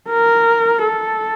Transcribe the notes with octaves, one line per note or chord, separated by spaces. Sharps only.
A#4
A4